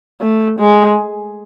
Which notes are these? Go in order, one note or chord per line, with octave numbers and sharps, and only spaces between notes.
A3
G#3